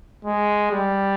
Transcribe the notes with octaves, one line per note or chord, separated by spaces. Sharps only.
G#3
G3